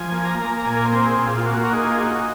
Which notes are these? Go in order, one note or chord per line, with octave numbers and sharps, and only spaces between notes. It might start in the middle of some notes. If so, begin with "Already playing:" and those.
Already playing: F3 G#5
A#3
A#5
A#3
A#5
A#2 G#5
A#4
C5
C4
A#4
G#4
A#2
F4
F4
A#3 F#4
A#4
D#4 G#4
F4
D#4 F#4